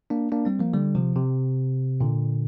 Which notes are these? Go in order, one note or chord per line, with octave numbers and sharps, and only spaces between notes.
A#3 D4
A#3 D4
G3 C4
F3 A#3
D3 G3
C3 F3
C3
A#2 D3